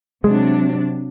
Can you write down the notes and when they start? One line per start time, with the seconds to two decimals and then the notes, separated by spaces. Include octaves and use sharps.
0.24 C3 F#3 G#3 D4